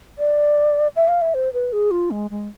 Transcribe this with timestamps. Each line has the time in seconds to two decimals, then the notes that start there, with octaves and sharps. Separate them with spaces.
0.18 D5
0.96 E5
1.08 F5
1.21 E5
1.34 C5
1.53 B4
1.73 G#4
1.91 F4
2.11 G#3
2.31 G#3